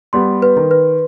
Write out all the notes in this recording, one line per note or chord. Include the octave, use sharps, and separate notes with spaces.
G3 B3 C6
B4
D#3
B4